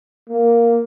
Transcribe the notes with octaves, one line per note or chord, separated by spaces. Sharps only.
A#3